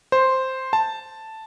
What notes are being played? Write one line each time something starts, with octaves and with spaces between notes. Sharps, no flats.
C5
A5